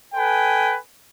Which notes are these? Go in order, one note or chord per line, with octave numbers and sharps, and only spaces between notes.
A4 B4 G5 G#5